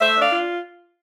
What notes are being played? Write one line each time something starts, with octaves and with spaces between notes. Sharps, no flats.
A3 C5 E5
D4
D5 F5
F4